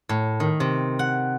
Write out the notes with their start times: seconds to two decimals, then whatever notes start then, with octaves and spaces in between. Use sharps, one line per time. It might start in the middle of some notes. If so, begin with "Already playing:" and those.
0.09 A2
0.40 D#3
0.60 C3
0.99 F#5